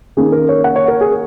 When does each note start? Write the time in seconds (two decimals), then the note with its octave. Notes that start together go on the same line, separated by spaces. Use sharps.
0.17 D#3 A#3 C#4 G#4
0.32 A#4
0.49 C#5
0.64 F#5
0.76 C#5
0.88 A#4
1.01 G#4